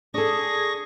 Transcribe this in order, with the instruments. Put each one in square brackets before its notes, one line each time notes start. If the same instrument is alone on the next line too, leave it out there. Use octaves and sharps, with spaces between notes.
[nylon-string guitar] D4 A4 [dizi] G#4 [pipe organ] C#6 D#6 A#6